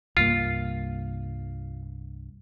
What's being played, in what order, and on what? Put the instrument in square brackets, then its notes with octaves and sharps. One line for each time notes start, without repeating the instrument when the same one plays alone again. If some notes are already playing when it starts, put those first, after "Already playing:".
[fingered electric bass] C2 G2 A#3 [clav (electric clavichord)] F4